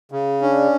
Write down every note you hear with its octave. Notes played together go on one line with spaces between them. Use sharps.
C#3
C#4 D4